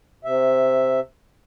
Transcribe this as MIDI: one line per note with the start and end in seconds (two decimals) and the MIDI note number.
0.24 1.00 48
0.24 1.00 76